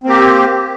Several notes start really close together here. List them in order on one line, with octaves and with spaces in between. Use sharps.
C4 A#3 G4